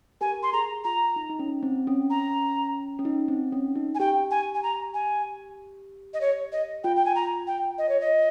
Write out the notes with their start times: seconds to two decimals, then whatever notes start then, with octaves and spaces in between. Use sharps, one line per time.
0.21 G4 A#4 G#5
0.43 C6
0.53 G#4 A#5
0.84 F4 A#5
1.16 D#4
1.30 D#4
1.39 C#4
1.63 C4
1.87 C#4
2.10 A#5
2.99 C#4
3.05 D#4
3.28 C4
3.52 C#4
3.76 D#4
3.95 G#5
4.00 G4 G5
4.31 G#5
4.54 G#5
4.63 A#5
4.94 G#5
6.14 D#5
6.21 C#5
6.52 D#5
6.84 F4 G5
6.97 G5
7.05 G#5
7.15 A#5
7.47 G5
7.78 D#5
7.89 C#5
8.01 D#5